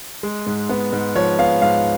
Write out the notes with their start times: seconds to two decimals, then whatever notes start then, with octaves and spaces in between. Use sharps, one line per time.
0.23 G#3
0.46 G#2
0.69 B3
0.93 G#2
1.16 F3 C#5
1.39 B3 F5
1.62 G#2 F5